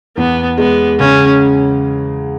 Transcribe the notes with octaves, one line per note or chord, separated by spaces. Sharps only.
E2 B3
G#3 B3
C#3 C#4